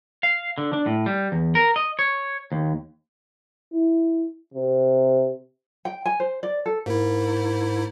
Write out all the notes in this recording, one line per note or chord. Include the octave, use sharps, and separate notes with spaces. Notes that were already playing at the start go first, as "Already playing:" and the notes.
F5
D3
D4
A2
G3
E2
A#4
D#5
C#5
D#2
E4
C3
G5
G#5
C5
D5
A4
G#2 A#3 E4